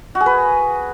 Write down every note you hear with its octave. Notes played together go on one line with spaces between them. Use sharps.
F#4
G#4
B4